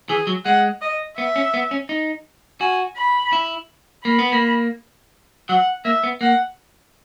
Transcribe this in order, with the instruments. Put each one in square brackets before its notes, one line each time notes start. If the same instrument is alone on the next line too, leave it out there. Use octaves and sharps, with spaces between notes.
[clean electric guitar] E3 [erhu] G#4
[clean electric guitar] F#3
[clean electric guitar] G#3 [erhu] F#5
[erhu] D#5
[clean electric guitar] B3 [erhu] E5
[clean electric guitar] C#4
B3
C#4
D#4
[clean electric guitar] F#4 [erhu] G#5
[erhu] B5
[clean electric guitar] E4
[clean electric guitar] A#3 [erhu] B5
[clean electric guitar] B3
A#3
[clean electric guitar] F#3 [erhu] F#5
[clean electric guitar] A#3 [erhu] E5
[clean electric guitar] B3
[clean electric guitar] A#3 [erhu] F#5